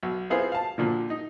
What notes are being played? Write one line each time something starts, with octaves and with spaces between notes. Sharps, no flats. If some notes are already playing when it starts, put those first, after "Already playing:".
B1
B3 C4 E4 F4 G#4 C5
F5 A5
A#2 D3 F3
D#4